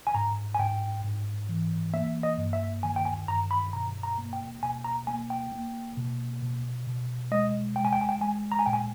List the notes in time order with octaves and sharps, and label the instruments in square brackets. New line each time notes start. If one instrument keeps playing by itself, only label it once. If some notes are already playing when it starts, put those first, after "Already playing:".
[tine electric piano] G#5
G#2 A#5
G#5
G#2 G5
G#2
E3
A#3 E5
D#5
G2
E5
D#3 G#5
G5
G#5
G2 A#5
B5
B2 A#5
A#5
A#3
G5
B2 G#5
A#5
A#3 G#5
G5
A#3
B2
B2
B2
G#3 D#5
G#3 G5
G#5
G5
G#5
G5
G#3 G#5
A#5
G#5
A#2 G5
G#5